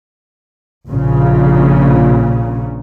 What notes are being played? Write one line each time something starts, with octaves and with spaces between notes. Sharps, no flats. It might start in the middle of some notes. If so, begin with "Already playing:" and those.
A#1 A#2 C#3